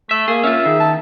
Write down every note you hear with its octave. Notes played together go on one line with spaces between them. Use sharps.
A3 E5
A#3 G#4
C#4 F4 E5
D#3 G#4
A5